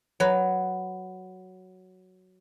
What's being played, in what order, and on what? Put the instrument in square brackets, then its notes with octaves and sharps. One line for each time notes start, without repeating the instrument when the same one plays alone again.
[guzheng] F#3 B4